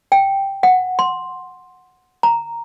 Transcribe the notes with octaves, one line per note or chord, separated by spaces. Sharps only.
G5
F#5
C6
A#5